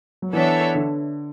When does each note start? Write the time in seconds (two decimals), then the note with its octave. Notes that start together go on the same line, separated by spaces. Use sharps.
0.22 F#3
0.32 E3 B3 D4 A4 C#5 E5
0.75 D3